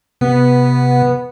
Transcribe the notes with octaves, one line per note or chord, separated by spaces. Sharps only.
C3 B3